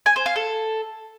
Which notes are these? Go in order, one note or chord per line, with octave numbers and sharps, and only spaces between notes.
G#5
C5
F5
A4